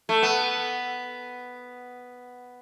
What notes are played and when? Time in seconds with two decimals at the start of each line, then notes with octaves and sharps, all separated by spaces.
0.09 A3
0.23 B3